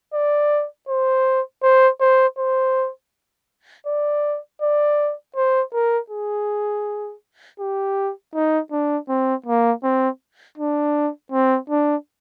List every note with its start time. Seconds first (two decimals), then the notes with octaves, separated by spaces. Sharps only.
0.14 D5
0.89 C5
1.63 C5
2.01 C5
2.38 C5
3.87 D5
4.62 D5
5.36 C5
5.73 A#4
6.10 G#4
7.60 G4
8.34 D#4
8.72 D4
9.09 C4
9.46 A#3
9.83 C4
10.58 D4
11.32 C4
11.70 D4